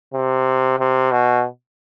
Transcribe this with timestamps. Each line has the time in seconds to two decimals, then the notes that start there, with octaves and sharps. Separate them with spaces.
0.14 C3
0.79 C3
1.11 B2